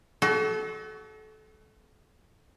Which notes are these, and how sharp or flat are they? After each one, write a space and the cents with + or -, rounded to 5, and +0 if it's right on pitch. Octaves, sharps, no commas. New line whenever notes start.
F#4 +35 A4 -30